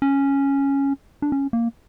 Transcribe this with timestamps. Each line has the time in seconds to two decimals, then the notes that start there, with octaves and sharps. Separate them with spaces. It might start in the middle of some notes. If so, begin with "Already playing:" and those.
0.02 C#4
1.22 D4
1.32 C#4
1.53 A#3